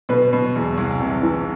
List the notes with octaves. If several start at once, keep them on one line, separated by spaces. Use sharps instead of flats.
B2 B4
B2
E2
C2
C3
E3